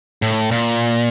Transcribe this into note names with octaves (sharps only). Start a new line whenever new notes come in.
A2
A#2